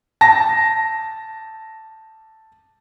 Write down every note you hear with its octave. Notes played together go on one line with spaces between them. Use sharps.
A5 A#6